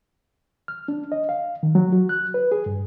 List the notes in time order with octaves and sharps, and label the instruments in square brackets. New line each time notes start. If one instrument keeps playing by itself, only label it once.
[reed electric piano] F6
D4
D#5
F5
D#3
F#3
F#4
F#6
B4
G#4
G2